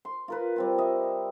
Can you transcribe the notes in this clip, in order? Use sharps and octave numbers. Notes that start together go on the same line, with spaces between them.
C6
F4 A#4 B4
G3 C4 F4
D#5 E5